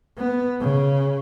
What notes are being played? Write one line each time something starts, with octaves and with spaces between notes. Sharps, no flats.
B3
C#3